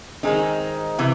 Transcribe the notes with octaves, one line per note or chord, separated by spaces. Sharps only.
D#3 G#3 C4 D#4
C3 E3